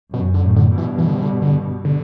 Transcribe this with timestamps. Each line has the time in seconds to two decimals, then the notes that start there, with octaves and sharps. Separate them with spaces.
0.13 F#2 B2
0.34 D3
0.41 F#2 A2
0.57 D3
0.71 G2 B2
0.78 E3
0.98 E3
1.07 D3
1.14 C3
1.22 D3
1.42 D3
1.85 D3